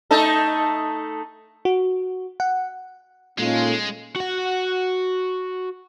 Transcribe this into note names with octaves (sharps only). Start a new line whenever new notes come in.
A3 D#4 A4
F#4
F#5
A#2 G#3 C#4 D#4 F4 A4
F#4 F#5